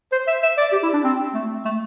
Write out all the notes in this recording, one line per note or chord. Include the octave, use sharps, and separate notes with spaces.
C5
E5
E5
D5
G4
E4
D4
C4
A3
A3